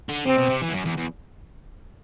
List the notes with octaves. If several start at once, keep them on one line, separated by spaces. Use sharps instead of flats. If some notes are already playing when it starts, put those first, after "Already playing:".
D3
C3 C4
B2
C3
E3
E2
F#2
E2
E2